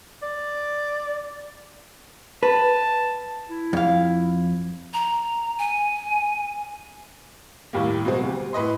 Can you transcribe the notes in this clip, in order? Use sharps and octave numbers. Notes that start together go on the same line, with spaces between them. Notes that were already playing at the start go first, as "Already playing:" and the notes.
D5
B4 A5
E4
F2 F5
A#5
G#5
D#2 A2 G3 A#3
B2 F#3 G#3 C4
D2 G3
A2 B4 D#5 C6